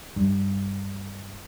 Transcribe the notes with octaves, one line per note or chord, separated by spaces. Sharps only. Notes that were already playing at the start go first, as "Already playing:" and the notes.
G2